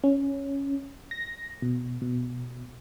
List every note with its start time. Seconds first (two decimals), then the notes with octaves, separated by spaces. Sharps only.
0.04 C#4
1.11 A#6
1.62 B2
2.02 B2